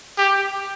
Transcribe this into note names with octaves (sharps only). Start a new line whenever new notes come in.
G4